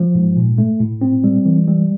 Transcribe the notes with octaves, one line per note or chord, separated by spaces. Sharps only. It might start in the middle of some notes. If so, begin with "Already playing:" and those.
Already playing: F3
G#2
A#2
A3
A2
C4
G3
E3
G3